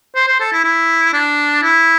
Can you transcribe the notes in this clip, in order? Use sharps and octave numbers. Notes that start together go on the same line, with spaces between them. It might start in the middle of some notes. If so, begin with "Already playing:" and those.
C5
C5
A4
E4
E4
D4
E4